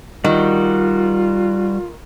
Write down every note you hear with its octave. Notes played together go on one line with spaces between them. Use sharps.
D#3 G3 F4 F#4